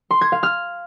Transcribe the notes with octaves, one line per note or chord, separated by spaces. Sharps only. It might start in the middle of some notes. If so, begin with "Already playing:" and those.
C6
G#6
F5
F6